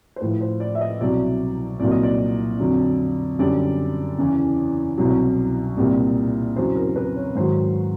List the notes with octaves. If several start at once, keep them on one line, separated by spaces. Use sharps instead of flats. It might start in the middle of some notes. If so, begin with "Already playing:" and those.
C5
A2 F3 B4
C5
D5
E5
D#5
C2 B2 F#3 D5
C2 A#2 F#3 D5
D#5
D5
F2 D3 F#3
F#2 D3 G3 D5
E2 C#3 E3
C2 B2 F#3
C2 A#2 G3
E2 C#3 F#3 C5
A#4
B4
C#5
G#2 D#3 F#3 C5